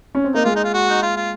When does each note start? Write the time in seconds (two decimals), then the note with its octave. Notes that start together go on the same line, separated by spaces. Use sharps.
0.15 C#4
0.24 C4
0.34 A#3 D#4
0.44 G#3 F4
0.56 D#4
0.64 F4
0.74 F#4
0.90 D#4
1.02 F4
1.16 F4